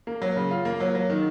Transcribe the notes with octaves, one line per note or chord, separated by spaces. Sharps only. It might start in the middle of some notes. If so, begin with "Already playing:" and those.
A#3
F#3
C#3
F4
A#3
F#3
F#3
D#3